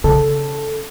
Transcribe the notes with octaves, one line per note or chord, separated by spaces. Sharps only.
C#3 A4